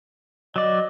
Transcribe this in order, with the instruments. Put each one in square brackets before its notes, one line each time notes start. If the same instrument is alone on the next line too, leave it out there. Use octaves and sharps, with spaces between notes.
[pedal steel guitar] F#3 D5 [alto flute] D#5